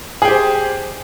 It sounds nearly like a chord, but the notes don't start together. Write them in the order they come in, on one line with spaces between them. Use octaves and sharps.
G#4 G5 G4 C5